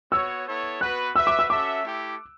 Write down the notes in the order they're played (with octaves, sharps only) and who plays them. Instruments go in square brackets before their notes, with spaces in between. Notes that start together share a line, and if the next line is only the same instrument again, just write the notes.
[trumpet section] B3 F#4 C#5 [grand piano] E6
[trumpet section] B3 E4 A4 C#5
[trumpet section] B3 F#4 B4 [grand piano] F#6
[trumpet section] F#4 B4 E5 [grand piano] E6
[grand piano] D6
E6
[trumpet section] C#4 F#4 A4 E5 [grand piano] D6
[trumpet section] A3 E4 G4